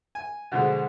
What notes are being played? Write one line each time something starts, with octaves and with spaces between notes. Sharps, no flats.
G#5
B2 D3 F3 G#3